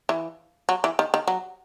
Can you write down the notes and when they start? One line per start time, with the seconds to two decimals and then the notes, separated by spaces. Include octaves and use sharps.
0.09 E3
0.69 F#3
0.84 E3
0.99 D#3
1.14 D#3
1.28 F#3